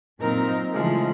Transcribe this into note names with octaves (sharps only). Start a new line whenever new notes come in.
A#2 F#3 C4 D#4 A#4
C#3 E3 F3 G#3 A3